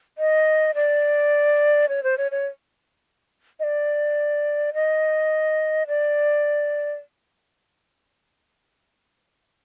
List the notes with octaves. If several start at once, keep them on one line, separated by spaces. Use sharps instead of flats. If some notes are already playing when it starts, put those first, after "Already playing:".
D#5
D5
C#5
C5
C#5
C#5
D#5
D5
D#5
D5